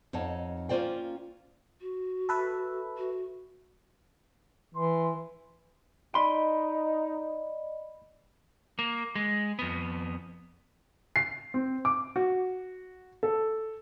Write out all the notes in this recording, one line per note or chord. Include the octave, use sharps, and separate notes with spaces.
F2 D#4 C#5 F#5 A5
A#3 C#4 F4 C5 D5 G5
F#4
A4 B4 E5
F#4
E3 C6
D#4 D5 D#5 B5 C6
A#3
G#3
F2 B3
C7
C4
D6
F#4
A4